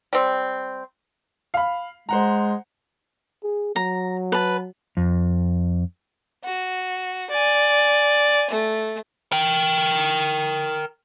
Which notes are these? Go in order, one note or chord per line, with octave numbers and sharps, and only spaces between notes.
G3 C4
F5 B5
G#3 C5 F#5 A#5
G#4
F#3 A#5
B4 A5
F2
F#4
D5 G#5
A3
A#4 G5